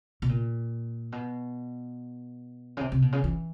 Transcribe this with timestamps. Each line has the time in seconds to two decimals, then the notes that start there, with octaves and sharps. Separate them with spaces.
0.22 B2
0.29 A#2
1.12 B2
2.77 C#3
2.81 C3
2.92 C3
3.02 B2
3.12 C#3
3.24 E3